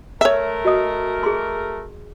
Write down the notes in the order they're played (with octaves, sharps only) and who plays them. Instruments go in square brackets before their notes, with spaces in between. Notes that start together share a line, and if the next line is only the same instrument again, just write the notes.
[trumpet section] A3 A#4 [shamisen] C#5 E5
[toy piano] F#4 D#5 D#6
G#4 C6